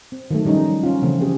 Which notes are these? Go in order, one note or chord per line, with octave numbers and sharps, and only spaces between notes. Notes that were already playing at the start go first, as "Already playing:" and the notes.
C4
D#3 F#3 A3
D#3 F3 G3 C#4 D#4
C#4 F4
C#3 E3 F3 A3 C4
C4 G4 G#4